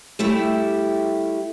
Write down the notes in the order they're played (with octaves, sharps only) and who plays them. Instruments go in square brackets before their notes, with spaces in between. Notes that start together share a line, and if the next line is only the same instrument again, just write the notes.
[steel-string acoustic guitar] G3 A3 E4 G4